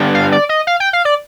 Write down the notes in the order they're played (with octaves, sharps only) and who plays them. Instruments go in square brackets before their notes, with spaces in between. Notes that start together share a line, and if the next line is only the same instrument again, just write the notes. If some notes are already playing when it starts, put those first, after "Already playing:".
Already playing: [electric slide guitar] D3 G3 B3 D4
[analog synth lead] F5
D5
D#5
F5
G5
F5
D5